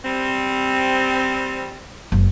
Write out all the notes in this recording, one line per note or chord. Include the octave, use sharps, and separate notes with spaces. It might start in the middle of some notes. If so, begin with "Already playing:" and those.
G3 C4
F#1